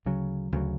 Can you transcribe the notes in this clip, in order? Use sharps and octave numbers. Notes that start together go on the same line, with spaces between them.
D2 C#3 F#3
D2 C#3 F#3